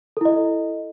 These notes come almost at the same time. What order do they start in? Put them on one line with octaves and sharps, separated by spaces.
A4 E4 D#5